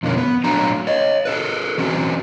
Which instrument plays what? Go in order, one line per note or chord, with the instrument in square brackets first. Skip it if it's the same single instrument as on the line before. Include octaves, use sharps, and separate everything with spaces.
[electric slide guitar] F2 B2 D3 A3 A#3 C#4
B3
F#3 A3 A#3 D4 A#5
C#5 D#5
G#4 A4 B4
E3 F#3 C4 C#4 F#4